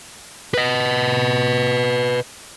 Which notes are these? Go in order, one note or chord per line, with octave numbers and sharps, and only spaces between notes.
B4 D#5